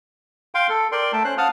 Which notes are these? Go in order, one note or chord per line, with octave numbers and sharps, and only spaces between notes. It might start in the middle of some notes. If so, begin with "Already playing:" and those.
F5 G5 C6
A4
A#4 D5 G5 C6
A3 G5 A5
C#4 C5 F#6
F5 F#5 A5 D#6 F6